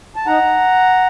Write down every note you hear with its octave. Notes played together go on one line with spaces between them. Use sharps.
A5
D#4 F#5 A#5